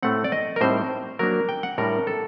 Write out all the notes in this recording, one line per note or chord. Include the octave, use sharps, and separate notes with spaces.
A2 A3 C4 F#5
D5
D#5
A#4
A2 G3 C4 D#4 C5
F#3 A#3 D4 A#4
G5
F#5
A2 G3 D4 A#4
A4